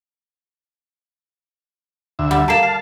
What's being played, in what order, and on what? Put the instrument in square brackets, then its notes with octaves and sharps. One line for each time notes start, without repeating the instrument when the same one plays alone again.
[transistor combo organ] D2 E5
[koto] G3 [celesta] F#5
[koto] A#3 G4 [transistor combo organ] A5 [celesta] A#5 C7 E7
[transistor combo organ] F5 A5 [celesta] C7